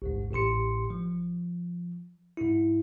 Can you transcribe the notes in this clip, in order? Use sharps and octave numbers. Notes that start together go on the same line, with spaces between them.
A1 D2 G#2
A1 A2 G4 C6 C#7
F3
G#2 E4